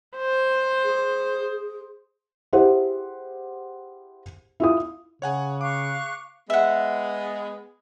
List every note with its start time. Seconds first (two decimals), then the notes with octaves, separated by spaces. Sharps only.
0.17 C5
0.84 G#4
2.53 E4 G4 G#4 C5 F#5
4.60 E4 F4 D#6
5.22 C#3 C#5 F#5 G#5
5.61 F5 C#6 D6 F#6
6.50 G#3 B3 E5 F#5